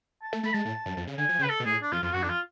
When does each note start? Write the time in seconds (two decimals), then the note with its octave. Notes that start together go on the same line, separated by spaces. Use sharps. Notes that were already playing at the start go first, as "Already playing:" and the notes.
0.23 A5
0.33 A3
0.43 A3 B5
0.54 G#3 A5
0.65 A2
0.86 F#2
0.97 F2
1.07 C#3
1.18 D3 G#5
1.29 F3
1.39 C#3
1.43 B4
1.49 A4
1.60 B2
1.65 A2 G#4
1.82 D4
1.92 F2 F4
2.02 F2 F4
2.13 F#2 F#4
2.22 F2 D4
2.29 F4